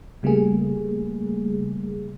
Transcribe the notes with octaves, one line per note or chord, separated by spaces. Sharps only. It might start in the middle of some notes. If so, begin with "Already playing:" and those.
C#3 G3 A3 A#3 G#4